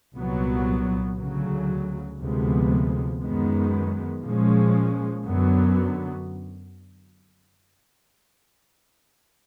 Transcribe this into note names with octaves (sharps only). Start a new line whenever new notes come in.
C2 A#2 F#3 B3
D2 C#3 F#3
D2 C3 F3 G#3 B3
F#2 D#3 G#3 B3
A#2 F3 G#3 C#4
F#2 D3 F#3 B3